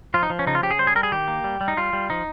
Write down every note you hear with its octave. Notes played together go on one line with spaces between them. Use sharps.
F3 F4
D#4
F3
C#4
C#3 D#4
F4
C#3 G4
G#4
G3 C5
G#4
G3 A#4
G#4
D#3 G4
A#3
G3
G3
D#4
G3 F4
G3
F3 D#4